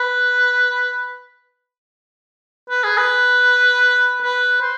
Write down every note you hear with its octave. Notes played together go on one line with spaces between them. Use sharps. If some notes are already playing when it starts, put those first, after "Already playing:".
Already playing: B4
B4
G#4
B4
B4
C5